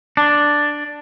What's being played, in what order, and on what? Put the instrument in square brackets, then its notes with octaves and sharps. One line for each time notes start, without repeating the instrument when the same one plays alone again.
[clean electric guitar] D4